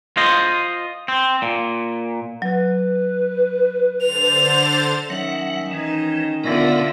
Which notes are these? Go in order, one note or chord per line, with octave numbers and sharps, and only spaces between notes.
F4 C5 D#5
C4
A#2
F#3 B4
D3 C5 A6 F7
D#3 F#3 C#4 E5 F#5
E3 D#4
A#2 D3 B3 F4 A#4 E5